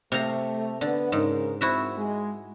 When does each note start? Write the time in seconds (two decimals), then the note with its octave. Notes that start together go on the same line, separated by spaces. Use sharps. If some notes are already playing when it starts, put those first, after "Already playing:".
0.12 C3 A3 F5 A#5
0.81 D3 B3
1.12 G#2 C#3 A#4
1.61 C4 E4 F#4 C5 E5
1.96 G#3